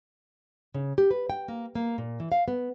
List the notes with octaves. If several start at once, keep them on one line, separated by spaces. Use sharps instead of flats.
C#3
G4
B4
G5
A#3
A#3
A#2
E3
F5
B3